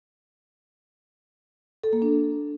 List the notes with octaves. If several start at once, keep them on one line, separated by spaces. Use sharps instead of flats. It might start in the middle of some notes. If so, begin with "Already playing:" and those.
A4
A#3
D4